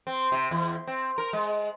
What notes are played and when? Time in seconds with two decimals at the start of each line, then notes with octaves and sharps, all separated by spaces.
0.07 C4
0.32 C3
0.51 E2
0.87 C4
1.18 A#4
1.33 G#3